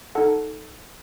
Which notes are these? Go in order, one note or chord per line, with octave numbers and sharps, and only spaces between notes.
D#4 A4 F#5 A5